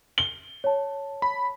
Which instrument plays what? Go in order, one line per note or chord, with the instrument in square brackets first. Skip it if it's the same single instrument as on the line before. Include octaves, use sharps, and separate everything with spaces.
[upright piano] G7
[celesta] C#5 A5
[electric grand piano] B5